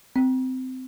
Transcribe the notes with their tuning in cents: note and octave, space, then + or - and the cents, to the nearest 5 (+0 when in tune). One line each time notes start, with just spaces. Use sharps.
C4 -20